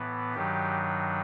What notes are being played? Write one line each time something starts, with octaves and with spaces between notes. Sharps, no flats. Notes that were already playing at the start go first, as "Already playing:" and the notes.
Already playing: A2 E3 B3
G2 D#3 F#3 G4